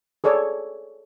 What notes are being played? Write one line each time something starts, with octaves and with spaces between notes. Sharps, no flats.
G#4 A4 C#5 D5